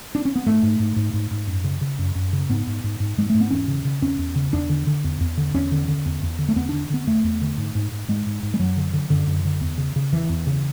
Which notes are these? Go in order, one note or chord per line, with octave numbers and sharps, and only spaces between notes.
D4
C#4
B3
G#2 A3
G#2
G#2
G#2
G#2
G#2
F#2
C#3
C#3
F#2
F#2
C#3
G#2 B3
G#2
G#2
G#2
G#2 G#3
G#2 A3
B3
E2 C#4
C#3
C#3
E2 C#4
E2
C#3
E2 D4
D3
D3
E2
E2
D3
E2 C#4
D3
D3
E2
E2
D3
A3
E2 B3
D3 D4
D3 B3
E2 A3
E2
D3
G#2
G#2
G#2
G#2 G#3
G#2
G#2
G#3
F#2 F#3
D3
D3
F#2 D3
F#2
D3
E2
C#3
C#3
E2 E3
E2
C#3